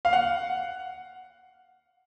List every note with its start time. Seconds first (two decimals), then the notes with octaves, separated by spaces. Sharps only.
0.05 F5
0.13 F#5